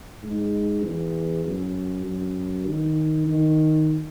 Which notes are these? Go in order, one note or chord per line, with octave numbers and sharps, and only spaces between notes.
G#2
E2
F#2
F#2
D#3
D#3